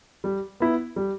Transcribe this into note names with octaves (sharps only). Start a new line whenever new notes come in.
G3
B3 E4
G3